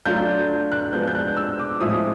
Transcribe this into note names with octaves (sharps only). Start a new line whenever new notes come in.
F#3 A3 D4 F4 G6
F#6
F3 G#3 B3 D4 G6
G6
F#6
E6
D6
A2 F3 G#3 C4 E4 D#6